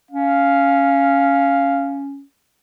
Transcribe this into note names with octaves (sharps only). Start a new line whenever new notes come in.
C#4 F5